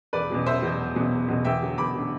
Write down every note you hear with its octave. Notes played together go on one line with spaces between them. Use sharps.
E1 B4 D5
E2 B2 F#3
E1 C5 E5
E2 B2 F#3
E1
E2 B2 F#3
E1
E2 B2 F#3
E2 E5 G5
D3 F#3
E2 B5 D6
D3 F#3